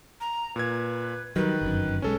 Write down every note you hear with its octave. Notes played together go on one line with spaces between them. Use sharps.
A#5
A#2 B4 G#6
D#3 F#3 G3 B4
G1 F#2
B1 G#3 C#4 A4